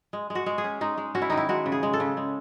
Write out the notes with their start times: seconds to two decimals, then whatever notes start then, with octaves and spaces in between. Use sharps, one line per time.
0.13 G#3
0.30 G#3
0.35 F#4
0.46 G#3
0.58 G#4
0.64 C#4
0.81 G#3 D#4
0.98 G#3
1.15 C#4 F#4
1.22 E4
1.30 D#3 D#4
1.37 E4
1.49 G#3 F#4
1.66 C#3
1.72 G#4
1.83 G#3
1.93 A4
2.00 C#3
2.17 G#3